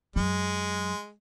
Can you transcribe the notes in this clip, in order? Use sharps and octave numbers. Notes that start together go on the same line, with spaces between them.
F#2 F#3 G#3